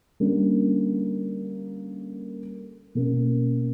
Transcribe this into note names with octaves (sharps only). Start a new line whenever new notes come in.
D3 G3 A#3 C#4
B2 A#3 C#4